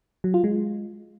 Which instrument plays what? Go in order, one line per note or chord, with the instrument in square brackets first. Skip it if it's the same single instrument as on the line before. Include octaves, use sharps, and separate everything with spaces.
[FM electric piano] F#3
F4
G#3